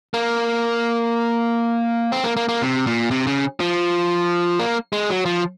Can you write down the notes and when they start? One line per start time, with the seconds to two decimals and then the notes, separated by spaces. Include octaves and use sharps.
0.14 A#3
2.12 C4
2.24 A#3
2.36 A#3
2.49 A#3
2.62 C3
2.87 A#2
3.11 C3
3.27 C#3
3.60 F3
4.59 A#3
4.93 G#3
5.09 F#3
5.26 F3